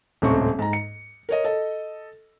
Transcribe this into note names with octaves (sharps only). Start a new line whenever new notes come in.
D#1 C#2 A2 C4 C#6
G#2 A#5
C#7
A#4 C#5 D#5
A4 D#5